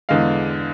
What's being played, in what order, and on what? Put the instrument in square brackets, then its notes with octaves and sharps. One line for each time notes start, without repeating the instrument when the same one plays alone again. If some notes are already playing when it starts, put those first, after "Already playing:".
[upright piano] E2 D3 G#3 F5